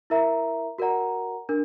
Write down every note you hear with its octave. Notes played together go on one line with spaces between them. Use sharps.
E4 A#4 E5 A#5
F#4 A#4 D5 F#5 A#5
D4 A#4